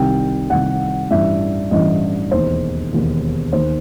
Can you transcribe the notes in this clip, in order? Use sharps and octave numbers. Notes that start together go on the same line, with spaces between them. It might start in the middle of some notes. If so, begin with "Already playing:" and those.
Already playing: C2 C3 D#3 G5
C2 C3 D#3 F#5
A1 G2 E3 E5
A1 G2 E3 D#5
E1 D#2 D#3 C5
E1 D#2 D#3
D#2 D#3 C5